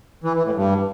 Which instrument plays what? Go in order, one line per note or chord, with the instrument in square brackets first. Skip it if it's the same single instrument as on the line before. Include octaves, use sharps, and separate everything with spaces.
[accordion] E3
E3
A2
G2